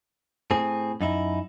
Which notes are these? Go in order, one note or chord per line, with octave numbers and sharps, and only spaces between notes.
A2 C4 G#4
F#2 D#4 E4